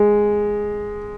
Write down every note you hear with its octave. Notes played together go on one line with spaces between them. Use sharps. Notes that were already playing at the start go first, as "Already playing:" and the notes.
Already playing: G#3